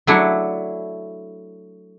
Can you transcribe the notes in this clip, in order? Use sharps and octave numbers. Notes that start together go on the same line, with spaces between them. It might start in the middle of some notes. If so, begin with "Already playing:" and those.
F#3 A3 D4 E4